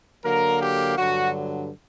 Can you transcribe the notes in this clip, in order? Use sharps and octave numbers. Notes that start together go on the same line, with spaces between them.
D3 F#3 A#3 A#4
G4
G2 D3 F#3 F#4